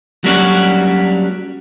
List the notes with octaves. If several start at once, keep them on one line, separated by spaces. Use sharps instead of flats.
F#3 G3 A#3 C#4 D4 F#4